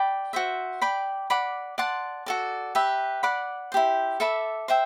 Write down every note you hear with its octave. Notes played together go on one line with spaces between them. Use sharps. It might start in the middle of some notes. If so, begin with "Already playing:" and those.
Already playing: D5 G5 B5 D6
F#4 C5 E5
D5 G5 B5 D6
D5 F#5 B5 D6
D5 F#5 A5 C6
F#4 A4 D5
G4 B4 E5
D5 F#5 B5 D6
E4 G4 C5
A4 E5 B5 D6
C5 E5 G5